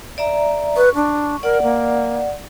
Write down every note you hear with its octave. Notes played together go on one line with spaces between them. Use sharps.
D5 E5 A#5
B4 C#6
D4
A#4 D5 F#5
A#3